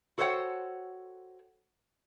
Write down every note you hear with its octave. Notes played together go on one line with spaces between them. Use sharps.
F#4 A4 C5 C#5 F#5 G5